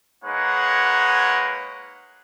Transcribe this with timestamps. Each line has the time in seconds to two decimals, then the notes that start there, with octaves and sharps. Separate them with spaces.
0.24 G#3 A#3 D#4 B4 C#5 F#5